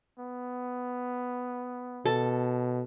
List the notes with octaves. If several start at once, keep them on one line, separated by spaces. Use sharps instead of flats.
B3
B2 A4